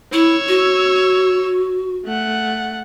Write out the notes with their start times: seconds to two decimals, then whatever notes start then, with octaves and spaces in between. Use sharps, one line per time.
0.13 E4 C#5 E6
0.48 F#4
2.06 A3 F#5